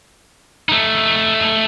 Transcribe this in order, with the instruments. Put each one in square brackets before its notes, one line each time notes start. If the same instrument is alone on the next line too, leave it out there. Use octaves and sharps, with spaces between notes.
[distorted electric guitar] A3 D#4